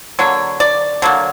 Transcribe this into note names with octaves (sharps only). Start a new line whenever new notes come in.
D3 F#3 A#3 C#5
D5
D3 F#3 A#3